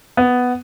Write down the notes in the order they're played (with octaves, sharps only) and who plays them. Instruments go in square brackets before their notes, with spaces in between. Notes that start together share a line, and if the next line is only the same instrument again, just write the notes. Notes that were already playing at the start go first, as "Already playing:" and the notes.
[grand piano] B3